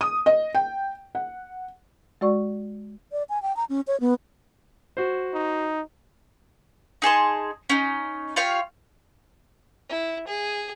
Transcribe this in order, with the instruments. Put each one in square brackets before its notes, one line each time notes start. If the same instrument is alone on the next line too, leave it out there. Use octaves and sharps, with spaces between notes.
[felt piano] D#6
D#5
G5
F#5
[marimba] G#3 F#4 D5 C#6
[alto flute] D5
G#5
G5
A#5
C#4
C#5
B3
[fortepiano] F#4 C5
[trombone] D#4
[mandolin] D#4 G#4 A5 C6
C#4 D#4
F4 G4 C#5 F5
[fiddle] E4
G#4